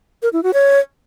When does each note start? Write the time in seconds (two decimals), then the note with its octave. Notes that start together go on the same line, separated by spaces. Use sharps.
0.23 A#4
0.33 E4
0.43 F#4
0.54 C#5